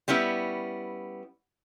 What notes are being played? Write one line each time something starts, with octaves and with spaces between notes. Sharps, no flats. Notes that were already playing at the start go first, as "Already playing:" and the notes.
G3 B3 C#4 E4